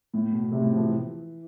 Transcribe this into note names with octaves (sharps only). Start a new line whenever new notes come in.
A2
B2
C3
A2
F3
E3